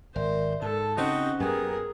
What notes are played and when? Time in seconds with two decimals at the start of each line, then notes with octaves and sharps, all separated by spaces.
0.16 G#1 A#4 C5 D5 E5
0.62 G#2 A4 A5
0.98 C#3 C4 C#4 D#4 F#4
1.40 F#2 F#3 A#3 B3 G4 G#4 A#4 G#5